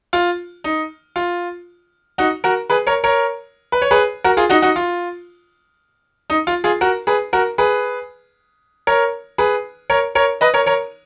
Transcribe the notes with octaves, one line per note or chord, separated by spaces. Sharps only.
F4
D#4
F4
D#4 F#4
F#4 A#4
G#4 B4
A#4 C#5
A#4 C#5
B4
C#5
G#4 B4
F#4 A#4
F4 G#4
D#4 F#4
D#4 F#4
F4
D#4
F4
F4 G#4
F#4 A#4
G#4 B4
F#4 A#4
G#4 B4
A#4 C#5
G#4 B4
A#4 C#5
A#4 C#5
B4 D#5
A#4 C#5
A#4 C#5